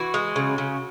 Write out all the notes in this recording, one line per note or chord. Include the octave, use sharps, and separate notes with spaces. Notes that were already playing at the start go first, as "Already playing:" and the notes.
Already playing: E3 F#4
G#3
C#3
C#3